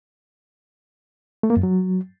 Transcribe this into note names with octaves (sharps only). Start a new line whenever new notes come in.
A3
A#3
F#2
F#3